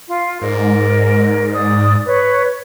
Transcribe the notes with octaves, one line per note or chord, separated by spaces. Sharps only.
F4
G#2 A#4 D5
D5 D#6
B4 C#5